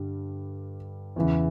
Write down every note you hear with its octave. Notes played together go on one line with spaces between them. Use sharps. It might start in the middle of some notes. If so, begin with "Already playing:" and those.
Already playing: G2 D3 G3
E2 C#3 E3